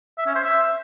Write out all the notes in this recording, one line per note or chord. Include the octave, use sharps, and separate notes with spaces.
E5
C#4
C5
E5